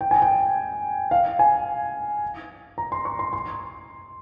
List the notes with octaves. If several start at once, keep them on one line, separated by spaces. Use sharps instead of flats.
G5
G#5
G5
F5
G#5
A#5
C6
C#6
C6
C6